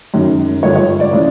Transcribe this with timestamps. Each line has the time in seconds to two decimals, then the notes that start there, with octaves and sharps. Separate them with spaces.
0.14 F#2 D#3 G#3
0.63 G2 D3 F3 G#3 C#5
0.76 C#5
1.00 D5
1.13 C#3 E3 G#3